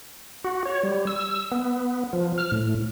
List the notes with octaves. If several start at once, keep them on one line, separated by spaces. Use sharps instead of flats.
F#4
C#5
G3
E6
B3
F3
F6
A2